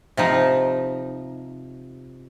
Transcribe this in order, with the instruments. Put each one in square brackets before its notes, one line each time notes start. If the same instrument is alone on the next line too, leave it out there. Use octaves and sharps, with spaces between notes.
[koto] C3 F3 D#4